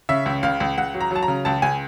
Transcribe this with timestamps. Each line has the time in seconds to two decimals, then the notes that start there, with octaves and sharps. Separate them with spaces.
0.09 C#3 E5
0.26 C#2
0.43 C#2 F5
0.60 C#2
0.77 C#2 F#5
0.94 F#3
1.01 A#5
1.11 F#3 A5
1.23 A#5
1.28 C#3
1.45 C#2 A5
1.62 C#2 G#5